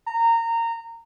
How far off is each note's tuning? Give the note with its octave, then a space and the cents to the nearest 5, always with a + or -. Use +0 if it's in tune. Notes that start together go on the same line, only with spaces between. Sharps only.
A#5 -20